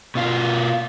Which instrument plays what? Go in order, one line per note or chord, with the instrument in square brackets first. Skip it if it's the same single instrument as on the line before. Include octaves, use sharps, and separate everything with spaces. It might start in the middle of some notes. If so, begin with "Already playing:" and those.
[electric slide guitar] B2 F4